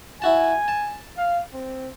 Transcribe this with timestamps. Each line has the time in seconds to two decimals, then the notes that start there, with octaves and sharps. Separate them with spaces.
0.22 E4 F#4 G#5 A5
0.68 A5
1.17 F5
1.54 C4